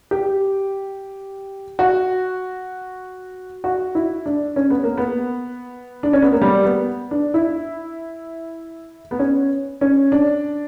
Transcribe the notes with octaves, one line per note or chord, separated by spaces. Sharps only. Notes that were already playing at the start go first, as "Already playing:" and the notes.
G4
F#4
F#4
E4
D4
C#4
B3
A#3
B3
D4
C#4
B3
A#3
G3
B3
D4
E4
B3
C#4
C#4
D4